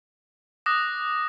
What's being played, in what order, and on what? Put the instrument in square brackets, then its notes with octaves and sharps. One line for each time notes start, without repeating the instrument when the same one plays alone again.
[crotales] D6 D#6 F#6 A#6